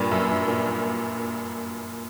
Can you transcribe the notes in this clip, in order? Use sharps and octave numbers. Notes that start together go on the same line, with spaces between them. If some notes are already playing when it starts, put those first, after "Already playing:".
Already playing: G2 A#2
F#2
G2
A#2